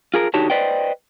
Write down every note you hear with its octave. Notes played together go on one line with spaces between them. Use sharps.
F4 G#4 A#4
D3 D#4 F#4 G4 C#5 A5
B4 C5 D5 D#5 G5